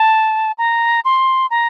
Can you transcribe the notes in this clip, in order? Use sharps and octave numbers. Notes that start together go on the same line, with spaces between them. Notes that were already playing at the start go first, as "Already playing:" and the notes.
Already playing: A5
A#5
C6
A#5